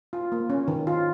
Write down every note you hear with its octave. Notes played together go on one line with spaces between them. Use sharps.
F4
A#3
C#4
D#3
F4